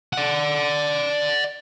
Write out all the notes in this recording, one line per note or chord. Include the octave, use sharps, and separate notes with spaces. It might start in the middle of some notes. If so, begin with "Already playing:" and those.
D5 F#5